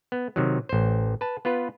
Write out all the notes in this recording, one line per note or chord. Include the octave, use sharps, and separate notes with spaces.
B3
C3 D#3 F#3
A1 C5
B4 A5
B3 F4 B4